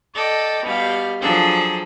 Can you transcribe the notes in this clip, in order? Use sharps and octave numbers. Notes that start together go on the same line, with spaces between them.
A4 D5 D#5 G5
B2 G3 G4 F5
F3 F#3 D4 G#4 A4